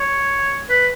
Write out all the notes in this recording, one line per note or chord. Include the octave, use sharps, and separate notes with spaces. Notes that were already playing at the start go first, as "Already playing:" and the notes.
Already playing: C#5
B4